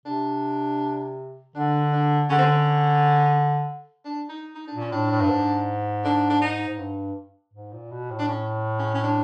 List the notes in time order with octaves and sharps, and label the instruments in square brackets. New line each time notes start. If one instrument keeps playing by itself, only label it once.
[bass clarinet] C3 [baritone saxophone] D4
[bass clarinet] D3 [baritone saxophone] D4
[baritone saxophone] D4
[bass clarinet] D3 [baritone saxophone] C#4
[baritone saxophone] C4
C#4
D4
D#4
D#4
D4
[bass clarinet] A#2
[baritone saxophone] C#4
[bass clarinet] A2 [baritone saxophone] D4
[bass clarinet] A2
G2
G#2
[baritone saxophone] D4
D4
D#4
[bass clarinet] G#2
G2
G#2
A#2
B2
A2
[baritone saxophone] D4
C#4
C#4
C#4
D4